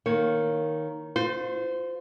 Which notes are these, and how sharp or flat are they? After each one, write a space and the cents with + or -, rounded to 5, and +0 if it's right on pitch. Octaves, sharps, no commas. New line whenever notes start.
D#3 +0 A#3 +0 C#5 +0
F4 +30 C5 -25